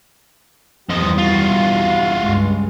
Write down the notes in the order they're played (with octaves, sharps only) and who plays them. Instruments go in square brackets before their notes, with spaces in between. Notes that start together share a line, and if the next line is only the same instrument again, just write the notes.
[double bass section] E2 G3 [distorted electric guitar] F3 D#5
[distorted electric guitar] F4 F#4
[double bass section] C#2 G2 G#3